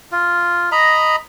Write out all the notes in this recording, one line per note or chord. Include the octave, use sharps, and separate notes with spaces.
F4
D#5 A#5 B5